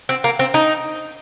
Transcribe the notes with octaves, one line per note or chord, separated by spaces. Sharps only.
C4
A#3
C4
D#4